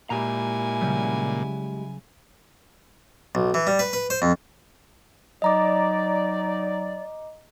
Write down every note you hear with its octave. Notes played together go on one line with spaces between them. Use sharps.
A#2 G#3 E4 G4 G#5 A#5
C#3 F#3 G3
B1
E3
G3
B4
B4
C5
F2
F#3 D#4 D5 D#5 A#5 D6